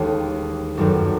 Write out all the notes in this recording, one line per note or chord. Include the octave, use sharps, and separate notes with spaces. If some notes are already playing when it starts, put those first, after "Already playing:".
Already playing: E1 D#2 D#3 A3 D#4
G1 F#2 D#3 F#3 A3